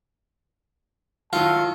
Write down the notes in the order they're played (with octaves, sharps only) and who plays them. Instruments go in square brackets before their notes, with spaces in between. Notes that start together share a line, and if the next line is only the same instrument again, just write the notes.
[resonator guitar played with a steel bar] A2 D#3 F#3 [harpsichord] F4 [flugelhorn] A5